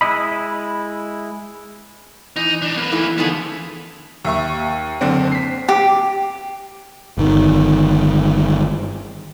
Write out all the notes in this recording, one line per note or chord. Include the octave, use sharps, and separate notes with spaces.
G#3 E4 D#5 B5
E3 D#4
D4 D#4
A#3 B4
E3 A3 E4
D3 D#3 F3 B3 G#4
D#2 E5 C#6
F#1 D3 C4
B6 C7
G4
G1 D#3